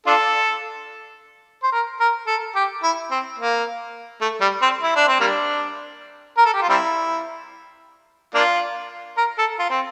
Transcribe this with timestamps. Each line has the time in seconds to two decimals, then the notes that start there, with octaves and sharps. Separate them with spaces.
0.07 D4 F4 A4
1.63 C5
1.72 A#4
2.00 A#4
2.27 A4
2.55 G4
2.83 E4
3.11 C4
3.39 A#3
4.21 A3
4.41 G3
4.62 C4
4.83 E4
4.96 D4
5.08 C4
5.20 G3 A#3 D4
6.37 A#4
6.45 A4
6.53 G4
6.62 F4
6.69 G3 C4 E4
8.34 A#3 D4 F4
9.17 A#4
9.38 A4
9.59 F4
9.70 C4